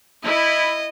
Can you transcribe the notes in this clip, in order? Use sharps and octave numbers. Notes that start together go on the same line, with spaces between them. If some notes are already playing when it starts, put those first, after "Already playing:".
E4 D#5